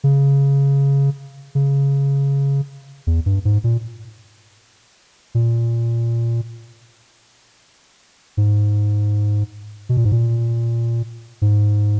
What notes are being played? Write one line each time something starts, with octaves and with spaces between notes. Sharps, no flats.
C#3
C#3
E2
G2
G#2
A#2
A#2
G#2
B2
A#2
G#2
A#2
G#2